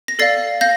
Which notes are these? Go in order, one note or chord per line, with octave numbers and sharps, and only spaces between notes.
A#6
A4 D5 F5 A6 C7
F5 G6 A#6